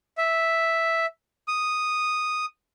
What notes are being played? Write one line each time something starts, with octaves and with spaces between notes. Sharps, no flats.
E5
D#6